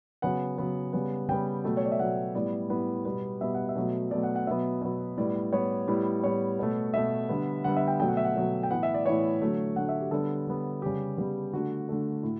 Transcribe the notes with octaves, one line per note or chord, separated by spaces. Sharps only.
C#3 F#3 B3 F#5
C#3 F#3 B3
C#3 G3 B3
C#3 G3 B3 G5
B2 F#3 A3
C#5
D5
E5
B2 F#3 A3 F#5
A2 G3 B3 D5
A2 G3 B3
B2 G3 B3
B2 G3 B3 E5
F#5
E5
B2 F#3 A3
B2 F#3 A3 D5
F#5
F#5
B2 F#3 B3 E5
B2 F#3 B3
A2 G3 B3 D5
A2 G3 B3 C#5
A2 G3 B3
A2 G3 B3 C#5
B2 A3
B2 A3 E5
D3 G3 B3
D3 G3 B3 F#5
E5
G5
B2 F#3 A3 G5
F#5
E5
F#5
B2 F#3 A3
G5
A2 E3 B3 F#5
E5
D5
A2 E3 B3 C#5
D3 F#3 A3
D3 F#3 A3 F#5
E5
G4
D3 G3 B3 A4
D3 G3 B3
C#3 G3 B3 G4
C#3 G3 B3
D3 A3 F#4
D3 A3
A2